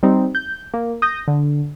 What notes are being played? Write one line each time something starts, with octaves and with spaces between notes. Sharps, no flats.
G3 C4 D#4
G6
A#3
D#6 G6 A#6
D3